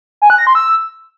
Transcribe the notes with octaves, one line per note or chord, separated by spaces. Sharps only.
G#5
F#6
A#6
C6
E6